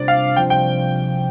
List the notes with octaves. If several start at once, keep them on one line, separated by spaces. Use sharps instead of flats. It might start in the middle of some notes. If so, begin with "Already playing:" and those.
Already playing: C3 G3 A#3 D4 F4 D5
F5
C3 F3 C4 F4 G5
G5